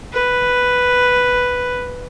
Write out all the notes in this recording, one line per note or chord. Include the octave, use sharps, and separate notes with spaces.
B4